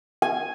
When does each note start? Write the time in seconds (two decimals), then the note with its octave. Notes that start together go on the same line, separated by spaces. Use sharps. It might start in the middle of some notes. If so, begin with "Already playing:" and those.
0.22 G#5